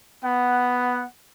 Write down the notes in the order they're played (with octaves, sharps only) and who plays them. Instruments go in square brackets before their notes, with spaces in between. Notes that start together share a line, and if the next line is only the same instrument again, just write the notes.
[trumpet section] B3 F#5